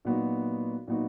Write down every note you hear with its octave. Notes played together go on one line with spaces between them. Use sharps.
A#2 F#3 B3 D#4 F#4
A#2 F#3 B3 D#4 F#4